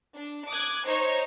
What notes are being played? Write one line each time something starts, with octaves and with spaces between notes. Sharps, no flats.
D4
D6 D#6 F#6 G#6
D#4 C5 C#5 C#6